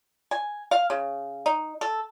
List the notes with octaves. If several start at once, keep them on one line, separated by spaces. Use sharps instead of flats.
G#5
F5
C#3
D#4
A4